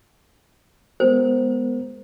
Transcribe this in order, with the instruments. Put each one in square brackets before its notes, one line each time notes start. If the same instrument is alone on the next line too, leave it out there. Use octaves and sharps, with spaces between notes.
[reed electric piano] G#3 B3 A#4 [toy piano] C5